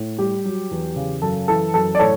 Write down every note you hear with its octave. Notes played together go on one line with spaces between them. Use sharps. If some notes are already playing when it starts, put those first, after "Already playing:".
Already playing: A2
G3 G4
F#3
E2
C#3
F#2 A4
E3 A4
F#2 A4
D5
A2 A4 C#5